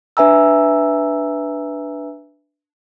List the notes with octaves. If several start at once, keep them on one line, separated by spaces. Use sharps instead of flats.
D4 B4 E5 G#5 A#5 E6